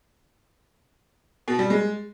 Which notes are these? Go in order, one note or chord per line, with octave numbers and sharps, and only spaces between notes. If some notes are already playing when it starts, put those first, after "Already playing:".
B2
G3
G#3